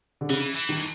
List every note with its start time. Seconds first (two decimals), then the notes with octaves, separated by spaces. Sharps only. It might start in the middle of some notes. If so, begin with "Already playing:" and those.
0.21 D3
0.29 C#3 E3
0.55 E3
0.69 D#3
0.77 D3